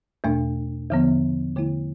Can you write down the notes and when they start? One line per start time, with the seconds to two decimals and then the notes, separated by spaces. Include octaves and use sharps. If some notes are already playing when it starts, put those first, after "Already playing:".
0.24 E2 B2 A3 D4
0.90 E2 D3 F3 B3
1.56 D3 A3 E4